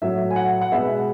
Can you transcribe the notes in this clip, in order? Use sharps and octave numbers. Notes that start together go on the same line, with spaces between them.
A2 F#3 A3 E5
G#5
F#5
F#5
B2 G#3 B3 E5